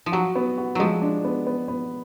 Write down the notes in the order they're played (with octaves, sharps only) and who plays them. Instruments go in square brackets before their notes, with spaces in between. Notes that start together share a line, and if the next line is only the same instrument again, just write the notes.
[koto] F3
[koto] F#3 [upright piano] F#4
[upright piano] B3
F#4
[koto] F3 F#3 [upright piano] G#3
[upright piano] D4
B3
B3
B3